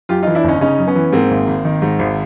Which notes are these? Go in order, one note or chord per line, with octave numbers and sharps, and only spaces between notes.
F#2 F4 G4
E3 D#4 F4
D4 E4
G1 C#4 D#4
C#3 C#4 D#4
F#2
B3 C#4
E3
G#2 A#3 C4
G#1
G#1
D#3
G#2
G#1